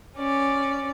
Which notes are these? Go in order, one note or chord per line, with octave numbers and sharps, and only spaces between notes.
C#4 D5